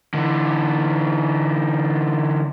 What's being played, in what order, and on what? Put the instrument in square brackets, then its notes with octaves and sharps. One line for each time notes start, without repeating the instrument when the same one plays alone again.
[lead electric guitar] D3 E3